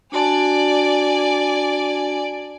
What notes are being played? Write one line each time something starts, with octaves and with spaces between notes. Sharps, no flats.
D4 F#4 D5 G#5 A5